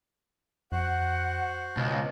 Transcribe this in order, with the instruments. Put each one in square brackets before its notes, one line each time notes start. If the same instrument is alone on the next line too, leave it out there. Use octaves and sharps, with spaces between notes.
[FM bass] F2 [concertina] F#4 C5 F#6 [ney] F#5
[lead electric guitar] C#2 [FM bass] B2 [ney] D#5